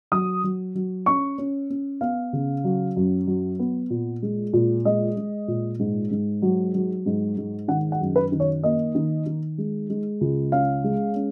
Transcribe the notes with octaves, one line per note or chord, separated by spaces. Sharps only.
F#3 D#6
F#3
F#3
C#4 C#6
C#4
C#4
B3 F5
C#3
F#3
F#2
F#3
B3
A#2
G#3
A#2
G#3 D#5
G#3
A#2
G#2
G#2
F#3
F#3
G#2
G#2
D#3 F#5
F#5
F#2
B4
D#3
C#5
A#3 D#5
D#3
D#3
G#3
G#3
C#2
C#4 F5
G#3
C#4